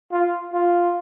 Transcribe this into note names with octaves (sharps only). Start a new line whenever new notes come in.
F4
F4